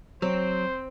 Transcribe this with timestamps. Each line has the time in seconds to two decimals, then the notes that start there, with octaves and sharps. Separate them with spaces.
0.22 F#3 C4 C5